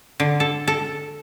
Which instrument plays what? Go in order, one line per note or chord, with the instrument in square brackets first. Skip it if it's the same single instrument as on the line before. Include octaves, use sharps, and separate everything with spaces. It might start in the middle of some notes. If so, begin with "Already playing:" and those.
[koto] D3
A4
A4